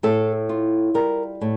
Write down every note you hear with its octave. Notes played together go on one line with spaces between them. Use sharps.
A2 A4
F4
G3 A#4
A2